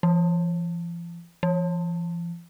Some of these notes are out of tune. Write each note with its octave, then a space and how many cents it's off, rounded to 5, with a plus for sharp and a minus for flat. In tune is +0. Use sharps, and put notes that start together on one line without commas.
F3 -45
F3 -45